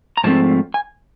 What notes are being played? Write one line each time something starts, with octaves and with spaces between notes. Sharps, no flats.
A#5
G#2 F3 A3 C4 A5
G#5